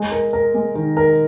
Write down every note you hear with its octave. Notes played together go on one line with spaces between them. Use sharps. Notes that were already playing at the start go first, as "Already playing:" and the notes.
Already playing: G#3
A#4
A#4
G#3
D#3
A#4